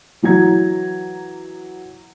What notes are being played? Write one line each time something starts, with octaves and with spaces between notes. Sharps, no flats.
E3 F#3 A#5 G#6